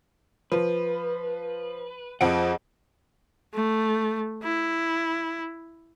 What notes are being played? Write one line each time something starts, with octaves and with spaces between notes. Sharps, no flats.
F3 B4
F2 F3 G#4 D#5 F#5 D7
A3
E4